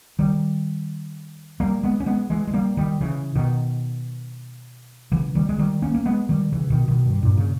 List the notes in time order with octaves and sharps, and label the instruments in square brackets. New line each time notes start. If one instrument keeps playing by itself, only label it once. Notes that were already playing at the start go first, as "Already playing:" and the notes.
[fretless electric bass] D#3 G3
G3 A#3
G#3 B3
C#4
G#3 B3
E3 G#3
G#3
G3 A#3
D#3 G3
C#3 E3
B2 D#3
C#3 E3
D#3 G3
G#3
D#3 G3
A#3 C#4
A#3
G#3 B3
D#3 G3
C#3 E3
B2 D#3
B2 D#3
G2
G2 A#2
C#3